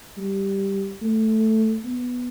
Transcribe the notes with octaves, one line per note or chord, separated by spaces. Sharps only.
G3
A3
B3